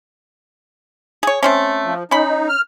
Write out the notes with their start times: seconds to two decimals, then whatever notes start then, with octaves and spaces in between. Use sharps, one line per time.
1.23 G#4 C#5
1.43 A3 C4 C#4
1.84 F3
2.11 C#4 D#4 B5
2.48 F6